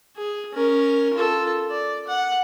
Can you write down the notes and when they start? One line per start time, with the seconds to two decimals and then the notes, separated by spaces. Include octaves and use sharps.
0.16 G#4
0.53 C#4 A#4
1.14 F4 A4
1.70 D5
2.07 F#5